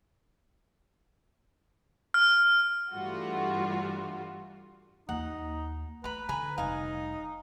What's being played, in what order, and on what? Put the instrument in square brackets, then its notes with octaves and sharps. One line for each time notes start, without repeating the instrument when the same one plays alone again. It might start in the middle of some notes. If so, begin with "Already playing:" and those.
[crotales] F6
[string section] G2 E3 G3 A3 F4 F#4
[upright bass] D#2 F4 [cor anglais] D#4 [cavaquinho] F#5
[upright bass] A3 [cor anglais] B4 [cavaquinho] A#5 B5
[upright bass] D3 [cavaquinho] G#5 A#5 B5
[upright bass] F1 G3 [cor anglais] D#4 [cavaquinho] F5 G#5